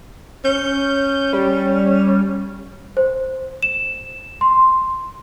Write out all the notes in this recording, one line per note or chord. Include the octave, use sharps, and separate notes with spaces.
C#4 G6
G3
C5
E7
C6